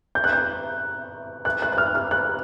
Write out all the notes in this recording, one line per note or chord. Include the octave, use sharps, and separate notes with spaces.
G6
F#6
G6
F#6
F#6
F#6
F6
F6
F#6